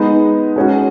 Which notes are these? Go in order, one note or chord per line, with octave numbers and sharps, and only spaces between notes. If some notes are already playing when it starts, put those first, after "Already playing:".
Already playing: G#3 B3 D#4
G#3 C#4 F#4